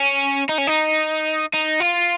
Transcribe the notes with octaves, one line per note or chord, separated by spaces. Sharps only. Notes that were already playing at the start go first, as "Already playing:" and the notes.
Already playing: C#4
D#4
C#4
D#4
D#4
F4